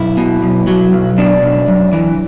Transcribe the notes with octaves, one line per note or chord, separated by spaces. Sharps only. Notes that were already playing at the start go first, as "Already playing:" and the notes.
Already playing: B1 E4
B2
B1
F#3
B1
B2 D4
B1
F#2
E3